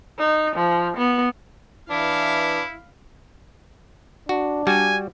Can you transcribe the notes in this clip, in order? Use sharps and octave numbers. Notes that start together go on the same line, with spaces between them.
D#4
F3
B3
E3 D4 E4 F5 B5
D4 F#4
G3 F#4 G#5